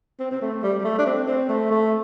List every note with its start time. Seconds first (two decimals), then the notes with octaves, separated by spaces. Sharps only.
0.20 C4
0.31 C4
0.42 A3
0.63 G3
0.80 G3
0.85 A3
0.98 D4
1.06 C4
1.28 C4
1.49 A3
1.71 A3